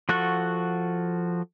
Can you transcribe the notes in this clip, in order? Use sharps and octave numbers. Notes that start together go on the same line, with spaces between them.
F3 F#4 A4 F#5 C#6